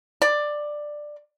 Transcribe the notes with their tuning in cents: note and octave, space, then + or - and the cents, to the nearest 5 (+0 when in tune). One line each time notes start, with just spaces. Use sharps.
D5 +10